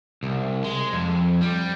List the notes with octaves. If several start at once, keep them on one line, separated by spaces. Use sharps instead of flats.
C2
G#3
F2
G3